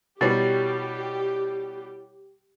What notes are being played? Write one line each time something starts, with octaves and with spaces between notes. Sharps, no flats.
B2 G3 E4 G4 C#5 A6